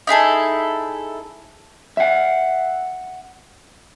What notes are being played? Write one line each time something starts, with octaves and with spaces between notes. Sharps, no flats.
D#4 E4 G#4 A4
E5 F#5